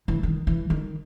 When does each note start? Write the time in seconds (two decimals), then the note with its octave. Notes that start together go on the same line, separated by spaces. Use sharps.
0.08 E3
0.23 D#3
0.47 E3
0.70 D#3